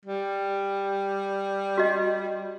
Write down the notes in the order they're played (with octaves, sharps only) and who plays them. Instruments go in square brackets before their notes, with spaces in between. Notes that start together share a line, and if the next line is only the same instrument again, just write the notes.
[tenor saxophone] G3
[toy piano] F#4 D#5